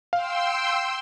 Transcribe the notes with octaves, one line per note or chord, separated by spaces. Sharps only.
F5 G5 C6 E6